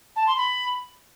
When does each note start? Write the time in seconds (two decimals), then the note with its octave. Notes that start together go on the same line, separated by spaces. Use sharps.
0.16 A5
0.27 C6
0.37 B5